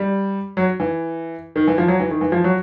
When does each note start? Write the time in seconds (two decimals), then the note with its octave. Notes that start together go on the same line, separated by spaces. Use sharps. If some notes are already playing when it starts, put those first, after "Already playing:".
Already playing: G3
0.57 F#3
0.80 E3
1.56 D#3
1.67 E3
1.78 F3
1.88 F#3
2.00 E3
2.11 D#3
2.21 E3
2.32 F3
2.44 F#3